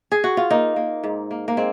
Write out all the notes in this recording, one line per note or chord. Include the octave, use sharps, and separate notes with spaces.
G#4
F#4
F4
A#3 D#4
A#3
G#2
A#3
A#3
G#3 C4